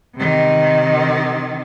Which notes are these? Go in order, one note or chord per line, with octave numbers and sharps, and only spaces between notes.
C3 D#3